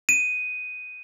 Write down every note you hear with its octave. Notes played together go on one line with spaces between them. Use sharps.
D#7